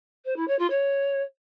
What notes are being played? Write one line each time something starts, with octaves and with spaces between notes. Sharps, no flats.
C5
E4
C#5
F4
C#5